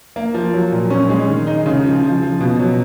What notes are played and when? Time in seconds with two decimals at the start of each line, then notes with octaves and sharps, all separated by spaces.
0.16 A#3
0.34 F3
0.53 F#3
0.72 A#2
0.90 C#4
1.09 G#3
1.28 D#3
1.47 D#4
1.66 C#3
1.85 F3
2.03 F3
2.22 F3
2.40 B2
2.59 F#3